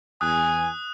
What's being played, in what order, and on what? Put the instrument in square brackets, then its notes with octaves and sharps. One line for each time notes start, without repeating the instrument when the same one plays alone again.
[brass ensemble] E2 G#5 [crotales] D#6 F#6